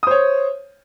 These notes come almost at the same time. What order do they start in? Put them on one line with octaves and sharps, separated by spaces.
D#6 C5 C#5